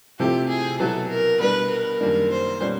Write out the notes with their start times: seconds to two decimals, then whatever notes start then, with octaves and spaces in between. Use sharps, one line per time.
0.19 C3 F3 A3 C4 E4 G4
0.49 G#4
0.79 B2 F#3 B3 E4 A4
1.09 A#4
1.40 B2 G3 B3 D4 B4
1.71 A#4
2.00 F#2 D#3 G3 A#3 D4
2.30 C5
2.61 B2 G3 A#3 C#4